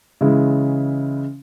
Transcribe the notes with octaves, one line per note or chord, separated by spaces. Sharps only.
C#3 E3 G#3 C#4 E4